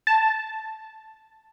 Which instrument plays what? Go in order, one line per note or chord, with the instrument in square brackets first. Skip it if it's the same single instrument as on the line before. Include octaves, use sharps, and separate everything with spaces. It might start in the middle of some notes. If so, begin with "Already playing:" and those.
[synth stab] A5